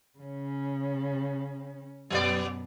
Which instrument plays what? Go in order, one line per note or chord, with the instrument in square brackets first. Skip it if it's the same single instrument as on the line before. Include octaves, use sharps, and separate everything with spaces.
[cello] C#3 C#4
[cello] F#2 B2 [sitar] F#3 B3 D5